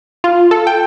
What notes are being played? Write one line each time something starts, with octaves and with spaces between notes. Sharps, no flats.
F4
A4
G5